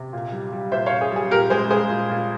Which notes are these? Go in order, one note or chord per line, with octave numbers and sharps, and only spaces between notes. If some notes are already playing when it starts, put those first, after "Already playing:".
Already playing: C3
A#2
G3
G3
A#2 C5 E5
C#5 F5
A#2
G#4
G3 G#4
A#2 G4 A#4
G#3 G#4 C5
G#3 G#4 C5
A#2
A#2